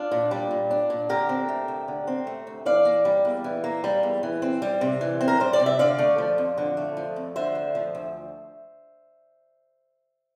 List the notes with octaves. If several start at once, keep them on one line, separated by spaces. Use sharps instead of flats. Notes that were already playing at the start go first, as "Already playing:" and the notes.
Already playing: D4 F4
A#2
G3
A#2
D4
A#2
D3 G4 A#4
C4
A3
D2
D3
C4
A3
D2
E3 D5 F5
A#3
G3
E2
E3
A#3
G3
E2
E3
C4
G3
C3
E3
C4
A#4
G3 C5
D5
C3
E5
D3 D5 F5
A3
F3
F2
D3
A3
F3
F2
D3 C5 E5
D2
F3
D2